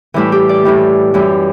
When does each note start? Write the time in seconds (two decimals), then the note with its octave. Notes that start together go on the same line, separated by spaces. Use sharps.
0.14 A2 E3 G3 E4
0.32 G4
0.49 D5
0.65 A2 E3 G3
1.14 F#2 E3 G3